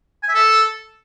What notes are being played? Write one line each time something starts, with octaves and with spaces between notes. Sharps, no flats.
G#5
E5
A4